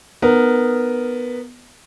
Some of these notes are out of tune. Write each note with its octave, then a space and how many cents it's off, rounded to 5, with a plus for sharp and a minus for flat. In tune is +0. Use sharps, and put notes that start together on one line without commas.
B3 +0 D#4 -35 A#4 +0